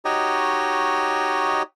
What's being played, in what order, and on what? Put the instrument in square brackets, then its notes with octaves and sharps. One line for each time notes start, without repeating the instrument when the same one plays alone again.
[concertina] D#4 F#4 G4 C#5 D#5